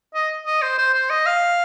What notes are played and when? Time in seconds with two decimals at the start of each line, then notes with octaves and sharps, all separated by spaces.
0.14 D#5
0.46 D#5
0.62 C5
0.78 C5
0.94 C5
1.10 D#5
1.26 F5